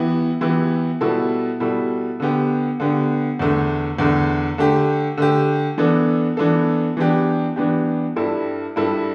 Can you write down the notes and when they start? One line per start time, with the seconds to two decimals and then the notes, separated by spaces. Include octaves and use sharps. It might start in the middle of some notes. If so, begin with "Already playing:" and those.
Already playing: E3 B3 E4 G4
0.41 E3 B3 E4 G4
1.01 B2 G3 E4 A4
1.60 B2 G3 E4 A4
2.20 D3 B3 G4
2.80 D3 B3 G4
3.39 E2 D3 A3
3.99 E2 D3 A3
4.58 D3 A3 G4
5.17 D3 A3 G4
5.78 E3 B3 D4 A4
6.37 E3 B3 D4 A4
6.97 E3 B3 D4 G4
7.56 E3 B3 D4 G4
8.16 G2 G3 E4 A4
8.76 G2 G3 E4 A4